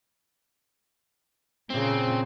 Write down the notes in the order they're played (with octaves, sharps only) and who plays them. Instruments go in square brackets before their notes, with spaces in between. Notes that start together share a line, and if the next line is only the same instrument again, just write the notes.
[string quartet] A#2 C#3 [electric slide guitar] C4